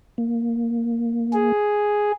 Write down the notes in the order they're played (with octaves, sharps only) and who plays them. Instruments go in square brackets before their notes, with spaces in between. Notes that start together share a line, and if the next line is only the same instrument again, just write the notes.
[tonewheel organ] A#3
[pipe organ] G#4